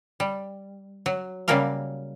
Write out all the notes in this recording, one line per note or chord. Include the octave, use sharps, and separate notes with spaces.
G3
F#3
C#3 F#3 G3 A#3 A#4 F5